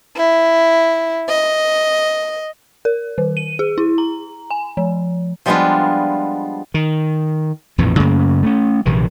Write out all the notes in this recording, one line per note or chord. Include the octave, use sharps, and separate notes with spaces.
E4
D#5
A#4
D#3
D#7
G#4
E4
A#5
G#5
F3
F3 G3 G#3 B3 D4 F4
D#3
A#1 F2 A2 E3
F#2 C#3 A3 A#3
A3 C#4
A#1 C3 D#3 E3